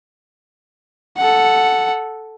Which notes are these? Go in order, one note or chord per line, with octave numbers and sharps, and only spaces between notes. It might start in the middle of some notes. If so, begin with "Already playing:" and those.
A4 F#5